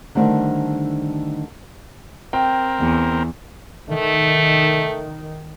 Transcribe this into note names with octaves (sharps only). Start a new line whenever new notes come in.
D3 D#3 G3 A3 C4 D4
C4 A#4 G5
E2
D#3 A3